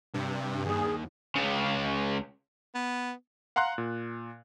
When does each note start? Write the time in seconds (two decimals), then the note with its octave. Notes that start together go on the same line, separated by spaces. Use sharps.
0.14 G2 C3
0.65 D#2 D#3 G#4
1.36 C#2 C#3
2.75 B3
3.56 F5 F#5 A#5 C6 F#6
3.78 A#2